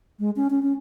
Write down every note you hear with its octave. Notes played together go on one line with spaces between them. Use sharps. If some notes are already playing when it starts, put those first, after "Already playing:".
G#3
C#4
C#4
C#4